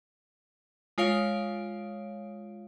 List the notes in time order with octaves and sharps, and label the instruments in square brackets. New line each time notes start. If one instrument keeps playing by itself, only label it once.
[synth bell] G#3 F4 C#5 F5 D7